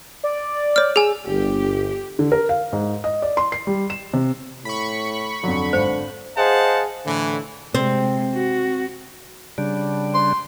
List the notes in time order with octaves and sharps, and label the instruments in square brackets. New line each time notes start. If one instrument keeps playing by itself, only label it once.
[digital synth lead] D5
[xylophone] C#5 F6
[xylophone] G#4 G#5 [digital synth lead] E6
[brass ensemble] G1 [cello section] G4
[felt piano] D3
A#4
F5
G#2
D#5
D5
C6
C7
G3
E7
C3
[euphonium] A2 [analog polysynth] B5 C#6
[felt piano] F2 F#3 [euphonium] D3
[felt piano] G#1 [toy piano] C5
[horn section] G#4 C5 D#5 F5 F#5 A5
A2 D3 E3
[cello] C3 G#3 [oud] C4
[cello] F#4
[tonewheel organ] C#3 G3 D4
[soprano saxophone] C6